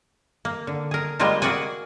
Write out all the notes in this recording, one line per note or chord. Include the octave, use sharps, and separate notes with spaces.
A#3
D3
G#4 A#4
G3 G#3 A#3 F4 A#4 C5
A#3 F#4 G#4 D5 F#5 G#5